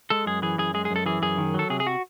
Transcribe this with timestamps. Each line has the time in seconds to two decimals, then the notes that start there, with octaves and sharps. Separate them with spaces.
0.10 G#3 A4
0.26 F#2 G#4
0.42 E3 G#4
0.59 F#2 G#4
0.74 G#3 G#4
0.85 G#4
0.91 F#2
0.96 A4
1.06 E3 G#4
1.22 F#2 G#4
1.38 D#3
1.54 F#3 A4
1.70 C3 G#4
1.80 G#4
1.87 F#4